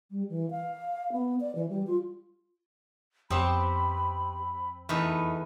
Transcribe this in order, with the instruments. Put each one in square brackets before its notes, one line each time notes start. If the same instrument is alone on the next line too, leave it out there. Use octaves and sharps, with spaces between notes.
[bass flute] G3
E3
F5
B3
D5
E3
G3
F4
[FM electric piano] F2 [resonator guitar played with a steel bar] B3 G4 C5 [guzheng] C4 [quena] B5
[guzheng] E2 B4 [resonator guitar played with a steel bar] A3 D#4